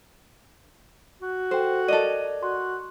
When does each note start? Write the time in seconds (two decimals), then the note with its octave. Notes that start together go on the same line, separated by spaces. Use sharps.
1.22 F#4
1.51 A4 C5 G5
1.89 A4 A#4 D5 D#5 D#7
2.43 F#4 C6